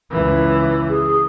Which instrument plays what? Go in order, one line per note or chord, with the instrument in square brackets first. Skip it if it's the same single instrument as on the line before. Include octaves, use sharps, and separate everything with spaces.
[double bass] C#2 E3
[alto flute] G#4